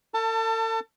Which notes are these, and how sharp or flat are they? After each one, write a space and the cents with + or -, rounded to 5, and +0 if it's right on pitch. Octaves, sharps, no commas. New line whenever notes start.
A4 +40 A5 +25